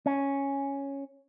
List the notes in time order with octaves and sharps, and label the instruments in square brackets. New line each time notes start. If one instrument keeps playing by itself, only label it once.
[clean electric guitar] C#4